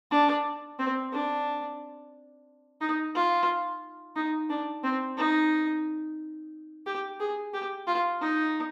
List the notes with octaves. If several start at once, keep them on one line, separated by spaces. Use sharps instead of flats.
D4
C4
D4
D#4
F4
D#4
D4
C4
D#4
G4
G#4
G4
F4
D#4